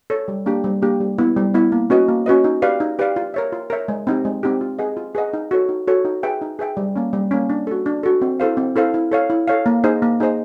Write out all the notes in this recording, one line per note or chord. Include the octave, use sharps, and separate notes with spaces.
A4 C#5
G3
A#3 D4 G4
G3
A#3 D4 G4
G3
B3 E4
G3
B3 E4
A#3
C#4 F#4 B4 D#5
A#3
C#4 F#4 B4 D#5
D#4
G4 B4 D5 F5
D#4
G4 B4 D5 F5
F4
A#4 C#5 E5
F4
A#4 C#5 E5
G#3
C4 D#4 G4
G#3
C4 D#4 G4
F4
G#4 B4 D#5 F#5
F4
G#4 B4 D#5 F#5
D#4
F#4 A4 C#5
D#4
F#4 A4 C#5
D#4
G#4 B4 E5 G5
D#4
G#4 B4 E5 G5
G3
A#3 C#4
G3
A#3 C#4
D4
F#4 A4
D4
F#4 A4
C4
E4 A4 C5 F5
C4
E4 A4 C5 F5
E4
A4 C#5 F5
E4
A4 C#5 F5
A#3
D#4 G#4 C5 D#5
A#3
D#4 G#4 C5 D#5